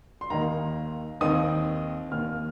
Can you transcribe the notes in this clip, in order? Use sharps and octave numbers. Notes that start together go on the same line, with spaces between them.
C6
D#2 D#3 A#3 D#4 A#5
D#2 D#3 C4 D#4 D#6
D#2 D#3 A#3 F6